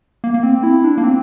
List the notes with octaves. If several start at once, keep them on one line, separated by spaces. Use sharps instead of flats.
A#3
A#3
C4
E4
D4
A#3
C4